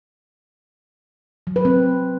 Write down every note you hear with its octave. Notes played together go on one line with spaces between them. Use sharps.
F#3
B4
C4